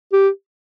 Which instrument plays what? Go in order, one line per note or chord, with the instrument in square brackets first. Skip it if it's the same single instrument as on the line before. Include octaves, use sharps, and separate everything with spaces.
[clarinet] G4